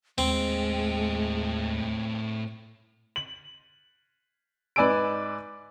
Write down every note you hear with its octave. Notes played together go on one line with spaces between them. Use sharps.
D#2 A2 G#3 C4 G5
F#7
G#2 B4 D5 G#5 E6 D7